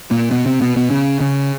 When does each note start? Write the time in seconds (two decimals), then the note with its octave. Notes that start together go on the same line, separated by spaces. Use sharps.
0.11 A#2 A#3
0.31 B2 B3
0.46 C3 C4
0.61 B2 B3
0.76 B2 B3
0.90 C#3 C#4
1.21 C#3 C#4